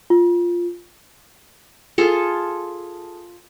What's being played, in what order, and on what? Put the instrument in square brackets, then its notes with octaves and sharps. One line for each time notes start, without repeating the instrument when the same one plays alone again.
[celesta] F4
[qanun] F4 G#4 A4